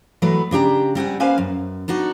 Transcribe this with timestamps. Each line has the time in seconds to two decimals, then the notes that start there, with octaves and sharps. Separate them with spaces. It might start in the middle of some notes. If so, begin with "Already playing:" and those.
0.22 E3 F#3 A3 B3 B4
0.51 C#3 D4 G4 A#5
0.95 G3 C4 F#5 G#5
1.20 A#3 C#4 B4 C5 F5 G#5
1.38 F#2
1.88 B3 D4 D#4 F#4